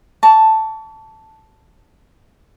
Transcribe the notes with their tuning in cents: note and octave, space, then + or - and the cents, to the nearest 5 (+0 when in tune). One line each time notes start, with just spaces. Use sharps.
A5 +0 C#6 +40